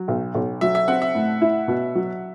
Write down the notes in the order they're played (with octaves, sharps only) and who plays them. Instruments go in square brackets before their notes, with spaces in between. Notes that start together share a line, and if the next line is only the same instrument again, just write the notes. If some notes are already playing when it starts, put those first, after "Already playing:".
Already playing: [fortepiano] F#3
B1
B1
[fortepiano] F#3 [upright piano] E5
[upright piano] E5
[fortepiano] C4 [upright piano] F#5
[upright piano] E5
[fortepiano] A2
E4
B2
F#3